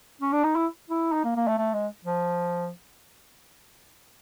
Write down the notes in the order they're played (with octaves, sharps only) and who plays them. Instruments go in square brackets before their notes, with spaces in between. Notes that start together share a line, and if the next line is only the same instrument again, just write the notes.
[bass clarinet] C#4
D4
D#4
E4
E4
D#4
A#3
A#3
A3
A3
G#3
F3